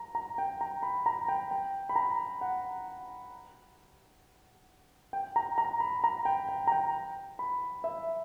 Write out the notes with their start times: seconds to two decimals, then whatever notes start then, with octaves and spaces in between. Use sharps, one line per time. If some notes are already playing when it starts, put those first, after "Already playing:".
Already playing: A#5
0.15 A#5
0.38 G5
0.61 A#5
0.83 B5
1.06 A#5
1.28 G5
1.51 G5
1.89 B5
1.96 A#5
2.41 F#5
5.13 G5
5.36 A#5
5.58 A#5
5.80 B5
6.04 A#5
6.25 G5
6.49 G5
6.67 A#5
6.72 G5
7.39 B5
7.84 E5